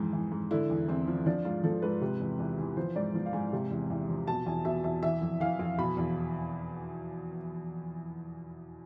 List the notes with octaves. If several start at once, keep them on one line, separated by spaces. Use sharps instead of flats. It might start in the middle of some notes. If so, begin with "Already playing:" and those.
Already playing: F2 G#2 E3
E3
G#2
D3 E4
E2
E2 C4
F3
F3 D4
G#2 F4
F3 A4
G#2 B4
C3
E2
E2
E3
F3 C5
G#2 D5
F3
F5
G#2 G#5
C3
E2
E2
F3
B2 A5
E2 G#5
B2 E5
E2 E5
E3 E5
F2
E3 F5
F2
B2 B5
E2